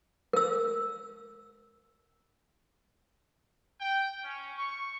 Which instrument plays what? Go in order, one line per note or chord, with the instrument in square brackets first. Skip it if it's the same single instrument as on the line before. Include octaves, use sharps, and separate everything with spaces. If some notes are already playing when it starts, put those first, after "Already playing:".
[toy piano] A#4 E6
[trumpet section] G5
C#4
C#6